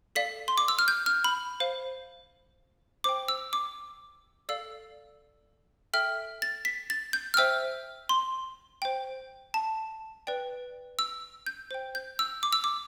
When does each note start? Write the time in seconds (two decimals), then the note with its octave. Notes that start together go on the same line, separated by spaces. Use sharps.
0.15 A4 D5 F5 B6
0.48 C6
0.58 D6
0.68 E6
0.79 F6
0.88 G6
1.06 F6
1.24 B5
1.60 C5 F5
3.04 C5 G5 D6
3.28 E6
3.53 D6
4.49 A4 D5 F5 E6
5.93 A4 E5 G5 F6
6.42 A6
6.65 B6
6.90 A6
7.13 G6
7.34 F6
7.37 C5 E5 G5 E6
8.09 C6
8.82 C5 G5
9.54 A5
10.27 B4 D5 G5
10.99 E6
11.46 G6
11.71 C5 G5
11.95 G6
12.19 E6
12.43 D6
12.53 E6
12.64 D6